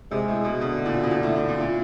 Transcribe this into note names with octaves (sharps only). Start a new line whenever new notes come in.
C3 G#3
A2
B2
B2 D3
A#2
B2
A#2
A2
A2
A#2
A#2